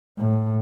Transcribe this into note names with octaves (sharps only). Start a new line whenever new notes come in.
A2